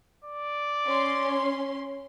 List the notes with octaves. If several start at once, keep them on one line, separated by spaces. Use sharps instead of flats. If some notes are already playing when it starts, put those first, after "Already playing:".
D5
C#4 C6